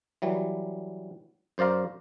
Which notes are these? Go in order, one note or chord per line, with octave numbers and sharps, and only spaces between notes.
E3 F#3 G3
F#2 C5 D5 F5 A#5